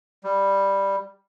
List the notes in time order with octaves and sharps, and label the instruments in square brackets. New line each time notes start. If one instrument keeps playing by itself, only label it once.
[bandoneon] G3